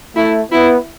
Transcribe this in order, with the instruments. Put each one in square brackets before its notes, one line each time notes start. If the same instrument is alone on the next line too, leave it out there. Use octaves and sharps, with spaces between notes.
[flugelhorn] A3 [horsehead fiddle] E4
[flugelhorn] B3 [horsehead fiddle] E4